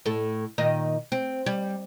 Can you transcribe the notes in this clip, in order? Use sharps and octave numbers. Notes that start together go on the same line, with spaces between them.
A2 A4
A#2 D#3 D#5
C4
G3